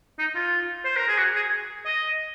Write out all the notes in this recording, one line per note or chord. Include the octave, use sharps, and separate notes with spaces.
D#4
F4
C5
A#4
G#4
F#4
G#4
D#5